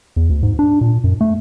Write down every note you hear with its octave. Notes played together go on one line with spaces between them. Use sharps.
E2
D2
G#2
D4
A#2
F#2
A3